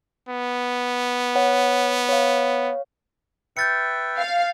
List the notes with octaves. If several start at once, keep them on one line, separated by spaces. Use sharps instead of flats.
B3
C#5 F#5
C#5 F5
B4 E5 G5 G6 A6 C#7
F5